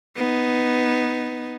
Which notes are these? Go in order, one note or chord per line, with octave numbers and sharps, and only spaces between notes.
B3 D#4